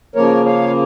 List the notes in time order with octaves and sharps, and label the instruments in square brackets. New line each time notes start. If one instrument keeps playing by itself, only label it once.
[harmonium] C#3 F3 A#3 A#4 C#5
C#5 F5